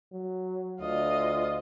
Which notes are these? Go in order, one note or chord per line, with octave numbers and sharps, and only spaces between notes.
F#3
D2 F4 D#5